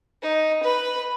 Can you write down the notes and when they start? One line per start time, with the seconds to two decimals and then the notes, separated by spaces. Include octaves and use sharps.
0.23 D#4
0.63 B4